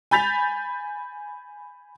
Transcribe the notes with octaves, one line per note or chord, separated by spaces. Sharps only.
G#5 B5 G6 A6 B6 F7